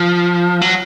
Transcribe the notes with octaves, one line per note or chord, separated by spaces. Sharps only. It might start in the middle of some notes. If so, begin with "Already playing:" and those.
Already playing: F3
F#3